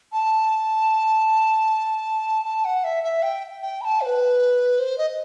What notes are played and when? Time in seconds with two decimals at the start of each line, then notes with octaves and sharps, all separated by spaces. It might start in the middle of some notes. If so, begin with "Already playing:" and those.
0.12 A5
2.45 A5
2.65 F#5
2.84 E5
3.04 E5
3.23 G5
3.62 G5
3.81 B5
3.85 A5
4.01 C5
4.06 B4
4.79 C5
4.98 D#5